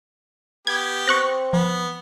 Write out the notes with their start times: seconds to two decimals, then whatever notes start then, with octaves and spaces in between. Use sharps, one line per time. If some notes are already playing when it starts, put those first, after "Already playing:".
0.67 B3 G4 G#6
1.08 C4 C#6 F#6 A#6
1.53 F3 B3